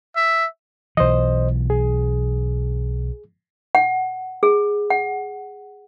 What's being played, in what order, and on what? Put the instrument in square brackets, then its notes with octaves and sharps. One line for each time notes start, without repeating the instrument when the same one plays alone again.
[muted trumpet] E5
[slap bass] B1 E3 [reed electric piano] C5 D#5
[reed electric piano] G#4
[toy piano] F#5
G#4
F#5